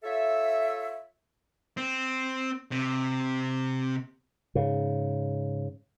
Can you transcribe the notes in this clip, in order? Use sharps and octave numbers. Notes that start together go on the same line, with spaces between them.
F4 A4 C#5 E5
C4
C3
G#2 C#3